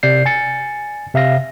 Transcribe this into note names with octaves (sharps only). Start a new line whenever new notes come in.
C3 D5 G6 C7
G#5 A6 C#7
C3 E5 F5 A#6